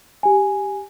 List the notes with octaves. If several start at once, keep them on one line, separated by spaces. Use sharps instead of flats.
G4 G#5